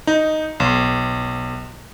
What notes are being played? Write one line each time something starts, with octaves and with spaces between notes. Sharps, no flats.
D#4
B1